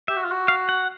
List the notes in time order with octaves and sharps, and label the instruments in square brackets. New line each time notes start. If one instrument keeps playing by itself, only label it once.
[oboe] G4 [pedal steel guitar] E5
[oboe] F#4
F4
F#4
[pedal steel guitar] F5
F#5